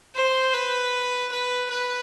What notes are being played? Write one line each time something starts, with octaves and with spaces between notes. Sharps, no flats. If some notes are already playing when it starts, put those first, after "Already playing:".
C5
B4
B4
B4